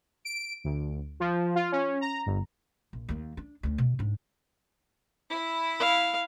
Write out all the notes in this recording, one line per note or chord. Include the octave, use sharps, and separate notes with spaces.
D7
D2
F3
F4
C#4
A#5
G1
A#1
D#2 A#3
D4
D2 D4
B2
G#2 D4
E4
F5